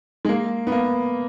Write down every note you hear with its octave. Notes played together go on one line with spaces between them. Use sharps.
G#3
A#3
B3
A#3